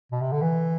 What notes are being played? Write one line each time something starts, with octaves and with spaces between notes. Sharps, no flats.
B2
C3
D3
E3